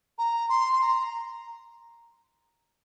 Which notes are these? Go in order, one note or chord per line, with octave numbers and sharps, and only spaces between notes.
A#5
C6
C6
A#5